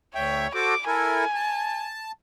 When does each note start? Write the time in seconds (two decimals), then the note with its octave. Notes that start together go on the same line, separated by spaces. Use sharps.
0.15 D2 C#5 E5 G5
0.54 F#4 A4 C5 D6
0.87 E4 A4 A#4 G#5
1.34 A5